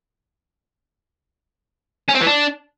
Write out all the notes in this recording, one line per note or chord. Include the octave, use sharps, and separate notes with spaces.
C#4
C4
E3
D4